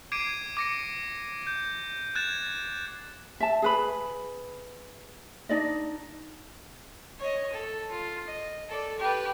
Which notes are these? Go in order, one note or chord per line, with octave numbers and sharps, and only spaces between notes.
D6 G#6 C7 D7 D#7
D6 A#6 C#7
G6
F#6 G#6 A6 E7
E5 A5
G#4 B4 B5
D4 D#4 D5 D#5
C#5 D#5
A4
F4
D#5
A4 D5
G4 B4